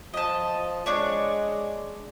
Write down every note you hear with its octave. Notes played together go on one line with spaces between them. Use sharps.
F3 D#5 A5
G#3 D4 C#5 D5